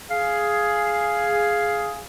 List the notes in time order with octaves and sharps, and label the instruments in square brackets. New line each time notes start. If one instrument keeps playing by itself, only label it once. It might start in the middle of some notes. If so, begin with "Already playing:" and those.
[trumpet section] G#4 [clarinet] F5